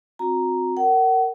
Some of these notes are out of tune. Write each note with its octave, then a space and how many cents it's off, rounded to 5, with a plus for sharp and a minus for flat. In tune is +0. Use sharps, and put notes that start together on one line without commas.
C4 +0 F#4 -35 A#5 +0
A#4 -20 F#5 +35